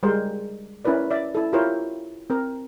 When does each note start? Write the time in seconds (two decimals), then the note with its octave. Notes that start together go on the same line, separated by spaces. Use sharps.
0.03 G3 G#3 A#4 C5
0.85 C#4 E4 A#4 B4 D5
1.11 D5 E5
1.35 E4 A4
1.53 E4 F4 G4 A#4 C5 C#5
2.30 C4 A#4